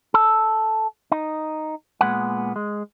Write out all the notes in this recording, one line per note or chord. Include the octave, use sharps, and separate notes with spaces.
A4
D#4
A#2 C#3 G#3 B3 F#5
G#3